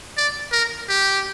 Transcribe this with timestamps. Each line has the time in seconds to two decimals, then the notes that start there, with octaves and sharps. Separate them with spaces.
0.17 D5
0.52 A#4
0.89 G4